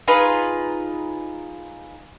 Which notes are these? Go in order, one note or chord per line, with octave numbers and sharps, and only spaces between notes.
D#4 F4 G#4 B4